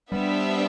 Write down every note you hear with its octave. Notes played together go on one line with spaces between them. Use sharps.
G3 B3 D4 G4 C5 E5